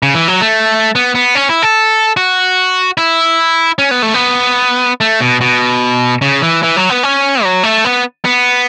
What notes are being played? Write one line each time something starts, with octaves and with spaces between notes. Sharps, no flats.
C#3
E3
F#3
A3
B3
B3
C#4
E4
A4
F#4
E4
C#4
B3
A3
B3
A3
B2
B2
C#3
E3
E3
F#3
B3
C#4
F#3
A3
B3
B3